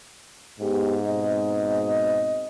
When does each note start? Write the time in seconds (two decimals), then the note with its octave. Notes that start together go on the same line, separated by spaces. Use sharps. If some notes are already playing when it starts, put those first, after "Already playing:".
0.60 G#2 B3 G4
1.06 B2 C4 D#5